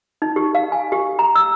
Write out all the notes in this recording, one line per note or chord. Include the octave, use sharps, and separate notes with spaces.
D#4
G4
F5
G#5
G4
A#5
E6